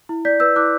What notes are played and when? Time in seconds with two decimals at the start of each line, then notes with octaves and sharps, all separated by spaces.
0.09 E4
0.25 D5 G6 B6
0.40 B4 E6 G6
0.56 E4 D6 F#6